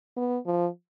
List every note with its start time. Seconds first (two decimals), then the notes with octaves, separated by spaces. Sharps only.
0.16 B3
0.46 F3